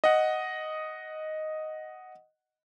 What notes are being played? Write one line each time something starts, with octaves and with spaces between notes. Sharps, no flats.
D#5 F#5